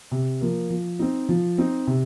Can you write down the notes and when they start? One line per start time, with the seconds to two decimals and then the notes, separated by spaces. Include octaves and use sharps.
0.11 C3
0.41 F3 A#3
0.70 F3
0.99 C4 D#4
1.29 F3
1.58 C4 D#4
1.87 C3